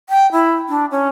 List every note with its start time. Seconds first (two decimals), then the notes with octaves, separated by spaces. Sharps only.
0.09 G5
0.32 E4
0.69 D4
0.91 C#4